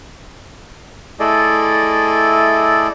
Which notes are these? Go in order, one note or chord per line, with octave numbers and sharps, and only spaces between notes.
A3 E4 G#4 A4 D5 D#5